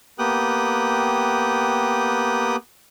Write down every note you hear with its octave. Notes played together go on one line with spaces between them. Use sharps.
A#3 B3 G4 G5 D#6 F#6